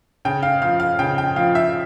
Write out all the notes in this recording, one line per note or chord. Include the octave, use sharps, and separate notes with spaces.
C#3 G5
F5
F3 F5
F5
C#3 G5
G5
F3 F5
E5